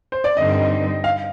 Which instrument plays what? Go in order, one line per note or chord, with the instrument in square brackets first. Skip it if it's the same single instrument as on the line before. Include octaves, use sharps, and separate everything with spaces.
[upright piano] C5
D5
[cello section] G2 D3 G3 C4 D#4 [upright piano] D#5
[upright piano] F5